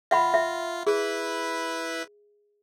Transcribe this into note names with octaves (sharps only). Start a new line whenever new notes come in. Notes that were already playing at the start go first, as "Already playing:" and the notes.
F4 E5 F#5 B5
E5
E4 G#4 B4